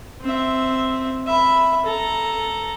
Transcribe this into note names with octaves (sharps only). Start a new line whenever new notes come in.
C4 E5
E5 B5
A4 A#5